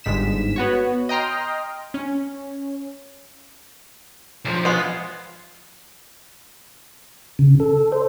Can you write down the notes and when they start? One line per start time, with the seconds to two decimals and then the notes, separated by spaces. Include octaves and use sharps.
0.04 G1 G#2 B6 E7
0.56 B3 F#4 C#5
1.09 D#5 G5 A#5 C6 F6
1.94 C#4
4.45 B1 F3
4.65 G#3 B3 F4
7.39 C#3
7.60 A4
7.92 C5